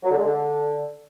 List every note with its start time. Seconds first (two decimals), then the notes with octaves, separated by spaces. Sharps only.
0.03 F#3
0.10 D3
0.17 G#3
0.24 D3